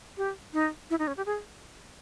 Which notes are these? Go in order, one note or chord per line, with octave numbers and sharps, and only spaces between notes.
G4
D#4
E4
D#4
C#4
G4
G#4